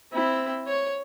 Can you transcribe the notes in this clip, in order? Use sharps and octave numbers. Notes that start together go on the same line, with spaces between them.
C4 E4
C#5